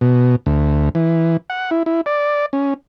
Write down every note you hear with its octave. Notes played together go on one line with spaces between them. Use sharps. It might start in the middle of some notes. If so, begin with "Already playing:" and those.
B2
D2
E3
F#5
E4
E4
D5
C#4